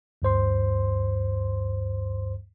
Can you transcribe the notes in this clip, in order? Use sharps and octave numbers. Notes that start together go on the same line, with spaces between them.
D2 G2 C5 C6